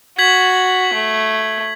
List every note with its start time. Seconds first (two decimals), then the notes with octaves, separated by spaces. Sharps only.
0.19 F#4 G#6 B6 F#7
0.93 A3